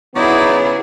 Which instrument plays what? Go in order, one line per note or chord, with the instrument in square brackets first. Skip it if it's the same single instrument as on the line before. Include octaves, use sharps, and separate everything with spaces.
[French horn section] C#3 B3 [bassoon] F#3 [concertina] D#4 F#4 D5 [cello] E4 G#4